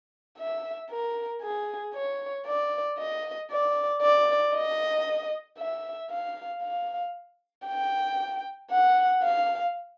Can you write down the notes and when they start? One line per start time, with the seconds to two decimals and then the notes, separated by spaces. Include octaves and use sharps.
0.38 E5
0.90 A#4
1.42 G#4
1.95 C#5
2.46 D5
2.98 D#5
3.51 D5
4.02 D5
4.55 D#5
5.59 E5
6.11 F5
6.62 F5
7.67 G5
8.71 F#5
9.23 F5